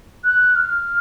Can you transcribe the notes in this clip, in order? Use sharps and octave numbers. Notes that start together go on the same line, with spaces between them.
F#6
F6